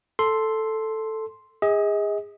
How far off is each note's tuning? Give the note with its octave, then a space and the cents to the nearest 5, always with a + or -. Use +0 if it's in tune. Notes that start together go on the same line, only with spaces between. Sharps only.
A4 +0 C6 +0
G#4 -25 D#5 +35